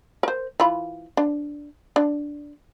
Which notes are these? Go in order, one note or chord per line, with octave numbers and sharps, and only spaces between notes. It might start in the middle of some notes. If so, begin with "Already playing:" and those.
A#4 C5
E3 F4 B5
D4
D4